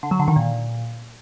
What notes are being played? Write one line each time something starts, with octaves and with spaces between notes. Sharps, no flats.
D3
F#3
D3
D#3
A#2